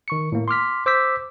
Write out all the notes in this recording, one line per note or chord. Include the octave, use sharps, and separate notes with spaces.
D#3 C#6 C#7
A2 A#3
C6 D6 F6 B6
C5 D6 E6 G6 B6